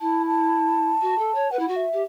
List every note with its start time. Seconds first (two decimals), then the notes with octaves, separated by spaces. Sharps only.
0.01 E4 A5
0.27 A5
1.02 F#4
1.19 A4
1.35 C#5
1.51 B4 F#5
1.59 E4
1.68 F#4
1.76 E5
1.93 G4